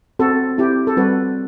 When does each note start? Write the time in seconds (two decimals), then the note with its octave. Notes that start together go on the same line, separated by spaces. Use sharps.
0.19 C4 F#4 A4
0.58 C4 E4 G4
0.87 A4
0.97 G3 C4 F#4 B4